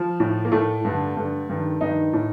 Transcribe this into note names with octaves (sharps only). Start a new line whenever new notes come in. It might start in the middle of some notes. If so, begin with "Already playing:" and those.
Already playing: F3
A2
A#3
A2 A3
G2 D3
G2 D3
G2 D#3
G2 D#3 D#4
A2